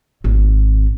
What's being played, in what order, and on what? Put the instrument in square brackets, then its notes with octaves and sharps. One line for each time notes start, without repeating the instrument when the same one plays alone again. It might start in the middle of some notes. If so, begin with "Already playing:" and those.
[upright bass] G#1 C4